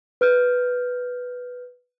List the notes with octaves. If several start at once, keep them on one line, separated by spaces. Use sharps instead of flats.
B4 F6 G6